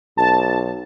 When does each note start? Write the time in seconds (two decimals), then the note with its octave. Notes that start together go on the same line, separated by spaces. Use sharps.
0.18 B1 A5